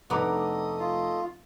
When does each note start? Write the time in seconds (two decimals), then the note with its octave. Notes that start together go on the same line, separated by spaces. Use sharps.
0.10 F1 A3 B3 D#4 D#5 A#5 D6 D#6
0.79 F4